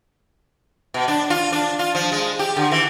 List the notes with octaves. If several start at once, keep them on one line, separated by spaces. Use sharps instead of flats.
B2
D4
F4
D4
F4
F3
G#3
G4
D3
E3